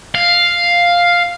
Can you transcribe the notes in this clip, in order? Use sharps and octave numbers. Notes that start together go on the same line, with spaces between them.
F5